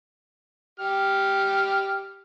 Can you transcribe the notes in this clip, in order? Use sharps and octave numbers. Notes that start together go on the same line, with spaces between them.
G4 F6